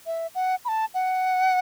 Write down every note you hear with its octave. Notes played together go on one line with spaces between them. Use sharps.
E5
F#5
B5
A5
F#5